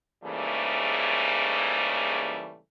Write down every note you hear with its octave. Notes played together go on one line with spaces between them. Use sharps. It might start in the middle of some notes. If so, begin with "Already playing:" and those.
G#2 C#3 E3 G3 A3 A#3